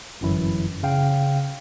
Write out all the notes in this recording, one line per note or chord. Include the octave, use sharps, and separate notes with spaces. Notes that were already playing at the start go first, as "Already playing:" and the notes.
G1 F#2 E3 E4
C#3 F5 G5